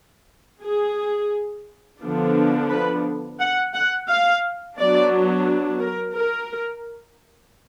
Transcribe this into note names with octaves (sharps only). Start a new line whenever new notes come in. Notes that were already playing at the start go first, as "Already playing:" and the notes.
G#4
D3 F3 B3 D4
B4
F#5
F#5
F5
F#3 B3 D4 D5
A#4
A#4